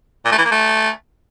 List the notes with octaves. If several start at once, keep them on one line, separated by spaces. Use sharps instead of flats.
A#2
A3
E3
A#3
A3